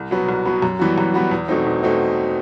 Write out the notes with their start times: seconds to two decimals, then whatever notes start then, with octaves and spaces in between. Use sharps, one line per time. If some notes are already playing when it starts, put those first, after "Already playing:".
Already playing: C2
0.11 B2 F#3 B3
0.29 C2
0.45 B2 F#3 B3
0.62 F#2
0.79 E3 G3 B3 F#4
0.98 F#2
1.14 E3 G3 B3 F#4
1.31 E2
1.48 B2 A3 C4 D#4
1.66 E2
1.83 B2 A3 C4 D#4